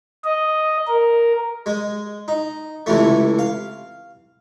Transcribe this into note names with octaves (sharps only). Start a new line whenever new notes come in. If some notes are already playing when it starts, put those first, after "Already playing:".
D#5
A#4
G#3
D#4
C#2 C3 E3 A3
F5